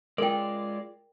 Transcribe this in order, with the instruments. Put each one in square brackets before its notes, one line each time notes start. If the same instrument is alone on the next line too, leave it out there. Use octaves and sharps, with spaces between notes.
[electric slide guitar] G#3 F4 [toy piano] A#4 G5 [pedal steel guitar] D5